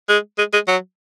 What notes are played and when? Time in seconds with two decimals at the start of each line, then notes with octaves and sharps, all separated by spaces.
0.09 G#3
0.38 G#3
0.53 G#3
0.67 F#3